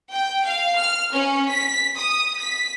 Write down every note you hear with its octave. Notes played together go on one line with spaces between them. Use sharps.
G5
F5
F6
C#4
B6
D#6
B6